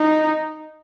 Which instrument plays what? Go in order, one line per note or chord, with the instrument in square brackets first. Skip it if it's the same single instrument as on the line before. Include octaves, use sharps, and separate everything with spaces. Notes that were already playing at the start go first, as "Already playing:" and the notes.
Already playing: [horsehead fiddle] D#4